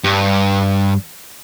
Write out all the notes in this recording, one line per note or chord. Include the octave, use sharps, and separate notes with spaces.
G2